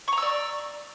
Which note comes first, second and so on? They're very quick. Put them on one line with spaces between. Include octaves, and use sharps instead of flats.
C#6 A#5 E6 D5